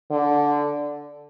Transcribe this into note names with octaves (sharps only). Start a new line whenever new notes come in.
D3